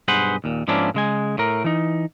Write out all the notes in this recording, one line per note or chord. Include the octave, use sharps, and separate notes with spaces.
B1 G2 G#4 B4 C5 F#5
D#2 A#2
G#2 F3 A#3 C#4 D4 E4
C#3 G#3 G#5
A2 A#4
E3 D#4